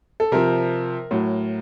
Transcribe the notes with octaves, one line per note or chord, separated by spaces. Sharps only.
A4
C3 F3 A#4
A2 F#3